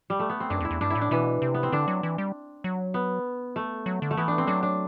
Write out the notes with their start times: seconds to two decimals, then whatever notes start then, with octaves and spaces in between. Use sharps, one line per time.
0.10 G3
0.20 A3
0.30 B3
0.40 C4
0.50 F#2 D4
0.60 E2
0.65 E4
0.71 E2
0.81 G2 D4
0.90 A2 E4
1.01 D4
1.11 B2 E3
1.42 C3
1.54 B3
1.63 C4
1.72 D3 D4
1.88 F#3
2.03 E3
2.18 G3
2.64 F#3
2.94 B3
3.56 A3
3.86 F#3
4.02 D3
4.11 A3
4.17 E3 B3
4.28 D4
4.38 C4
4.47 F#3 D4
4.63 D4